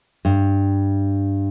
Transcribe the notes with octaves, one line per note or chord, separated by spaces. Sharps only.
G2